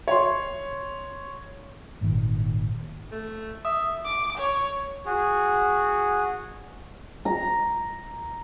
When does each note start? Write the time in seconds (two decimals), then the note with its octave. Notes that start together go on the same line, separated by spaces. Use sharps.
0.08 C#5 C6
2.01 G#1 A#2 D3 D#3
3.12 A3
3.65 E5 D#6
4.05 D6
4.38 C#5
5.06 F#4 G#4
7.25 A#5